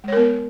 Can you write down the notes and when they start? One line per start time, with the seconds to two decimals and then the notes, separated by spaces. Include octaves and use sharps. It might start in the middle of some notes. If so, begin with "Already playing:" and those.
0.04 G#3
0.08 C#5
0.12 A#4
0.17 B3